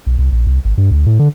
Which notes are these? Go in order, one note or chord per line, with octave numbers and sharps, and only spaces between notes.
B1
C2
A#1
C2
G#1
G2
D2
A2
D3